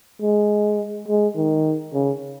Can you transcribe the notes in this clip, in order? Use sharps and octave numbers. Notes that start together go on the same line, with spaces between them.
G#3
G#3
D#3
C#3